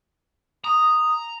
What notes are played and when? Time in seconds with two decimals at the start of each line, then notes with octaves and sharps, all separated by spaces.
0.64 A#5 D#6